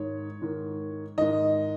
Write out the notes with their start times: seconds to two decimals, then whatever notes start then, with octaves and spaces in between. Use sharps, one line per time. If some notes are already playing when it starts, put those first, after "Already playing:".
Already playing: G#2 D#3 C#5
0.42 G#2 D#3
1.18 G#2 D#3 D#5